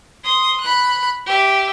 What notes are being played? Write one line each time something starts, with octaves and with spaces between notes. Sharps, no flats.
C6 D#6
B5 F#6
G4 E5